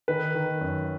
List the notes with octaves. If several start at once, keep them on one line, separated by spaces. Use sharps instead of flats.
D#3 B4
D#3
F#2